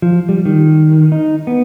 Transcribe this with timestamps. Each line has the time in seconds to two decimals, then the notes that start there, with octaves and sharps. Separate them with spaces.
0.02 F3
0.29 G3
0.45 D#3
1.12 D#4
1.47 B3